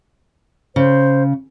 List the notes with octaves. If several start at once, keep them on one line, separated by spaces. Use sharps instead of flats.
C#3 C5